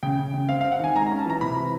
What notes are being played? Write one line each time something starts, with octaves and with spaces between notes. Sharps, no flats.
C#3 G5
C#3
C#3
C4 F5
C4 F5
F#5
D#3 G#5
G#3 A#5
C#4 A#5
A5
E3 A#5
C3 B5
E3